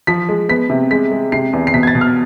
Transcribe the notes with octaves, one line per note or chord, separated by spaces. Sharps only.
F3 B6
G#3
B3 B6
C3
G#3 B6
G#3
C3 C7
E2
C7
B2 B6
G#6
A6
B2
F6